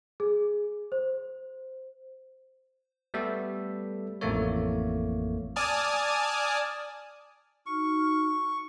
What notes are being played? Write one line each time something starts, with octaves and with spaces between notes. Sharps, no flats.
G#4
C5
G3 A3 B3 A4 E5
A1 F2 A2 A3 A#3 C#5
D5 G#5 A5 D#6 F6
D#4 F#4 C#6 F6